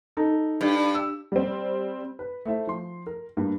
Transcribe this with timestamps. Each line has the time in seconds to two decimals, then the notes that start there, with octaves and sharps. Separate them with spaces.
0.17 D#4 A4
0.61 G2
0.94 E6
1.32 G3 C4
2.19 B4
2.45 A3 E4 C5 E5
2.67 F3 C6
3.07 A#4
3.37 G2 A#3